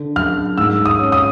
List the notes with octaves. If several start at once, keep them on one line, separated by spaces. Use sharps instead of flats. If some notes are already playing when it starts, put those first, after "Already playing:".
Already playing: D3
F#2 F6
G#2 E6
D#6
C#4
D#6